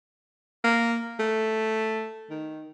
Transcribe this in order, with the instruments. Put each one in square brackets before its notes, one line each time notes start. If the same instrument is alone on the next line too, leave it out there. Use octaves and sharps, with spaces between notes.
[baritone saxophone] A#3
A3
D#3